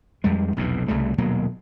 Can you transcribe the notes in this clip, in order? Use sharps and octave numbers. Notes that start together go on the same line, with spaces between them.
F2 G3 G#3
F1 B1 E2 B2
C2 C#3 G3 A3
D#1 B2 F#3 A#3